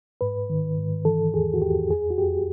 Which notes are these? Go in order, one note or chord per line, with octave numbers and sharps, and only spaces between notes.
G#2 B4
D#3
G#2
E3 A4
E2 G#4
F#4
E2 G4
F2 G#4
F#4
F2 G4